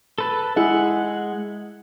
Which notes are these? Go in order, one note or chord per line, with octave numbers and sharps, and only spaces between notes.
A4 B4 A5
G#3 E4 G#4 E5 F#5